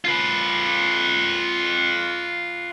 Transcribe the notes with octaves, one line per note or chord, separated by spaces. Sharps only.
F4 B4